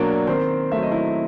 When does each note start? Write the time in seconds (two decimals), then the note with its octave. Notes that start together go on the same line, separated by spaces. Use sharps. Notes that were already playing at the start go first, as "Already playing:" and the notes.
Already playing: B2 F#3 A#3 D4 F#4 D5
0.27 D#3 C4 C5
0.72 F#3 A3 E5
0.83 D#5
0.92 E4 E5